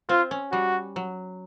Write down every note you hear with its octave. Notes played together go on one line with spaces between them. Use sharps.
C4 F4
C#4
G3 F#4
F#3